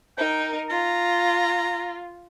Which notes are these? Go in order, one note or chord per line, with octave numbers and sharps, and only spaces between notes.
D#4 A#4 G5
F4 A#5